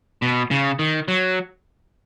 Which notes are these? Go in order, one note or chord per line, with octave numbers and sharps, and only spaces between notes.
B2
C#3
D#3
F#3